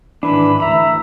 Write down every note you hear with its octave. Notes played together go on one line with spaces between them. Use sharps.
G#2 D#3 E3 D4 B5
D2 E3 E5 A#5 B5